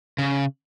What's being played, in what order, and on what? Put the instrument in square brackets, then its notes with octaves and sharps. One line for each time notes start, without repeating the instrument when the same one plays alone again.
[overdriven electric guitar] C#3